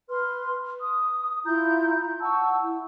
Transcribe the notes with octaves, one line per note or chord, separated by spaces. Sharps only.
B4 C6 F6
D#6
E4 F4 A#5 G6
F#5 A5 C#6 E6
E4